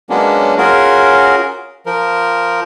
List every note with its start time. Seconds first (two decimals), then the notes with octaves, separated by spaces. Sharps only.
0.10 F#3 G#3 A#3 B3 C#4 D4
0.58 C#4 F4 F#4 G#4 A#4
1.86 F3 A#4